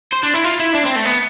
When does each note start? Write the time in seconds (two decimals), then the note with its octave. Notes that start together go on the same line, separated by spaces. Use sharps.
0.13 C5
0.23 D4
0.34 E4
0.44 F4
0.60 E4
0.75 D4
0.86 C4
0.96 A3
1.06 B3